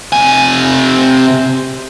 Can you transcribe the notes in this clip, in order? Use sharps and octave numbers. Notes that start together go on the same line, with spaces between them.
C3 G#5